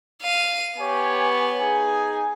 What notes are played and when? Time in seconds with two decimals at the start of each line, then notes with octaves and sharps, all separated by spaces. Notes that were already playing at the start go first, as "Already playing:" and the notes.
0.23 F5 D#7
0.79 B3 G4 C#5 G#5
1.60 D#4 G#4 G#5